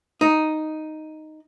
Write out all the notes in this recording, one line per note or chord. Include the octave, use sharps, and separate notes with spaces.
D#4